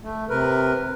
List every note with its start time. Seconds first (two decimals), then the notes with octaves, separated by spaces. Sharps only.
0.01 A3
0.30 C3 A#4 B4